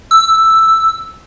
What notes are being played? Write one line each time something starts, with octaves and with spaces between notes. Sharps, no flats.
E6